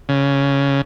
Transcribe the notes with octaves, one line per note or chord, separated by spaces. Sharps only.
C#3